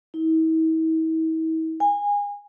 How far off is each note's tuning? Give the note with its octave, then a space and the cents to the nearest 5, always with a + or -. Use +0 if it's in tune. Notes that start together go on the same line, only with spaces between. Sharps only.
E4 -45
G#5 -25